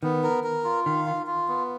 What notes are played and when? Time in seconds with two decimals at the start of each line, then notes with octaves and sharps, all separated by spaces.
0.03 D#3 B3
0.23 A#4
0.44 A#4
0.64 F4
0.85 D#3 F5
1.06 F4
1.27 F4
1.48 B3